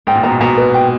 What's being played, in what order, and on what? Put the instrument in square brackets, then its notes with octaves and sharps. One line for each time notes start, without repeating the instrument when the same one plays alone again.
[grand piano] G#2 [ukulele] G5
[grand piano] A#2
[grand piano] B2 [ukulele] A#5
[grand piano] A#2
[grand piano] B2 [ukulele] A#5
[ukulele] B4
G5